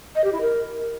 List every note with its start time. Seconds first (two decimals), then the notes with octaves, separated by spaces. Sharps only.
0.15 D#5
0.24 G4
0.32 E4
0.41 A#4